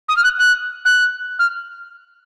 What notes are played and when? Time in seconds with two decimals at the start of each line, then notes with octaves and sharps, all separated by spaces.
0.08 D#6
0.16 F6
0.24 F#6
0.38 F#6
0.85 F#6
1.39 F6